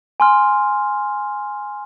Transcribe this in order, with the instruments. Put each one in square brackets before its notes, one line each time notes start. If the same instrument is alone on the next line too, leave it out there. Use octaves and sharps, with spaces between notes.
[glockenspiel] G#5 C6 F6